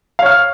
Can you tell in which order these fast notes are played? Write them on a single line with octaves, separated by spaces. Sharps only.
F5 C#5 F6